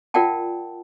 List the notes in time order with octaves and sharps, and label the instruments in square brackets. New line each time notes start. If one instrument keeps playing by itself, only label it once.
[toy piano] F4 A#4 D5 F#5 G5 A5